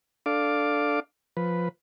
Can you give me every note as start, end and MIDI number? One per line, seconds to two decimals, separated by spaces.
0.26 1.00 62
0.26 1.00 69
0.26 1.00 77
0.26 1.00 86
1.37 1.69 53
1.37 1.69 71